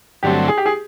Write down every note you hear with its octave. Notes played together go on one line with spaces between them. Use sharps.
G2 D3 F#3 A3 C4 G4
G#4
G4
G#4